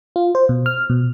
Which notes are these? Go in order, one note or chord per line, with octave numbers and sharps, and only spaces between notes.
F4
C5
B2
F6
B2